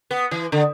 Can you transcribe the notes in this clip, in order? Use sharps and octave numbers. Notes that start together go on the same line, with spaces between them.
B3
E3
D3